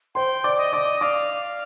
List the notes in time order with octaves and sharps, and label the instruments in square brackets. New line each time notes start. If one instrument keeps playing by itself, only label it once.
[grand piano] C5 C6 [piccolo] G5
[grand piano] D5 D6
[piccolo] D#5
[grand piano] D5 D6
[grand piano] D5 D6 [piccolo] F5